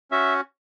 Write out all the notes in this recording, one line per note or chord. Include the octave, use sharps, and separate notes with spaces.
C#4 F#4 E5